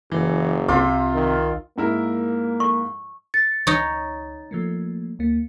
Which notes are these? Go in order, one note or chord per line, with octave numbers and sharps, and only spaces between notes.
F#1 E3
C2 C3 F4 C6 D6 E6
D#3
G#2 A#3 E4 A#4
C#6
A6 C#7
C#2 D#4 C#5
F3 A3 A#3
D2 A#3